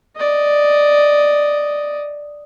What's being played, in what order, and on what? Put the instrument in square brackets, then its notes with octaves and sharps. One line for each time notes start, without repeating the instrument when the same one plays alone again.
[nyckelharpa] D5 D#5